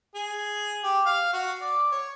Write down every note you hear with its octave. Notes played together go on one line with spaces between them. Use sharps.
G#4
G4
F5
F#4
D5
C#5